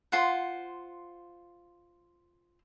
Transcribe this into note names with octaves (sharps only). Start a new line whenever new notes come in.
F4 C5 F#5